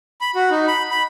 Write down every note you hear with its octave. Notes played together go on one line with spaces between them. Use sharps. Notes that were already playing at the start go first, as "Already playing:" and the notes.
B5
F#4
D#4
B5
B5